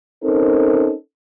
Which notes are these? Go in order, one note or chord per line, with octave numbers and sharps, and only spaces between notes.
C4 C#4 D#4 A4 A#4